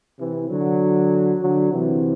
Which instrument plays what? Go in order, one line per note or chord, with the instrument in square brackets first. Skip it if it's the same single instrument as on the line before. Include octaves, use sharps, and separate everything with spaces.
[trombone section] C3 E3
D3 F#3
D3 F#3
C3 E3